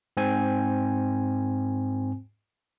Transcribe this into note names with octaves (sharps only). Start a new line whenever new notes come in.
G#2 C4 G#5